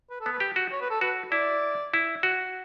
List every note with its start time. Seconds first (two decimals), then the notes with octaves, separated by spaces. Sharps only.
0.10 B4
0.21 A4
0.26 B3
0.32 B4
0.40 G4
0.56 F#4
0.72 C#5
0.81 B4
0.90 A4
1.01 F#4 B4
1.32 E4 D5
1.94 E4
2.23 F#4